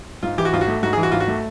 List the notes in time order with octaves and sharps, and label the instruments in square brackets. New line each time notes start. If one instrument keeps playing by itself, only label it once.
[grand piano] G#2 [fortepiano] F4
[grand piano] E3 [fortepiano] G4
[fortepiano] F#4
[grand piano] G#1 [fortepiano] F4
[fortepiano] F#4
[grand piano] A3
[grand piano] G#2 [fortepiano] F#4
[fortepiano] G#4
[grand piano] E3
[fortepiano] F#4
[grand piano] G#1 [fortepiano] F4
[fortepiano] F#4
[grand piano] A3